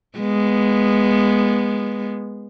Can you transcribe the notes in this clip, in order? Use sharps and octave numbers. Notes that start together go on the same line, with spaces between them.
G#3 B3